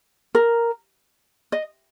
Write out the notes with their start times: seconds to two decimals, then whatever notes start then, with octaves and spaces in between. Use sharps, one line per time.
0.35 A#4
1.52 D#5